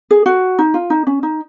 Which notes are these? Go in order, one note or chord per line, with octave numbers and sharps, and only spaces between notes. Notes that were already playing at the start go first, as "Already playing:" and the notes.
G#4
F#4
D#4
F4
D#4
C#4
D#4